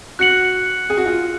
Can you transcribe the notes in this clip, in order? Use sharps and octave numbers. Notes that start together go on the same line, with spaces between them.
F#4 F#6 C#7 F#7
G#4
F#4
F4